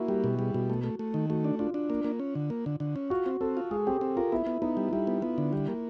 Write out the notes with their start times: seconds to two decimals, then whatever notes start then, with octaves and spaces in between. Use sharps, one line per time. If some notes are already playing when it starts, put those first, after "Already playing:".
Already playing: A#3 E4 F#4
0.08 G3 G4
0.24 B2
0.39 G3 G#4
0.54 B2 F#4
0.70 A3
0.84 A3
0.99 A3
1.14 D#3
1.30 A3 F#4
1.44 D4
1.59 D4 F4
1.74 D4
1.90 A#3
2.04 A#3
2.20 C#4
2.35 D3
2.50 A#3
2.66 D3
2.80 D3
2.96 C#4
3.10 F4 F#4
3.26 C4
3.41 C4 A4
3.57 F4
3.71 G#3 G#4
3.87 C4 G4
4.01 C4
4.17 F4 A#4
4.32 B3 E4
4.47 B3
4.62 B3 D#4
4.77 G3
4.88 F4
4.92 G3 E4
5.07 B3
5.22 B3 F4
5.38 D3
5.53 G3 E4
5.68 A#3